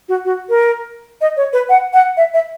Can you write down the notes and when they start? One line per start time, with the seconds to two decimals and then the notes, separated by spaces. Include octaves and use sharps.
0.09 F#4
0.25 F#4
0.49 A#4
1.21 D#5
1.37 C#5
1.53 B4
1.69 F#5
1.93 F#5
2.17 E5
2.34 E5